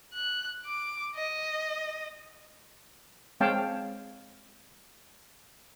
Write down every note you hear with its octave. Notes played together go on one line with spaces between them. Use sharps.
F#6
D6
D#5
G#3 C4 C#5 F5 G5 A5